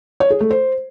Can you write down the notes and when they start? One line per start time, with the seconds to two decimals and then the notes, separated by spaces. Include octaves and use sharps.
0.20 C#5
0.30 G#4
0.40 A3
0.51 C5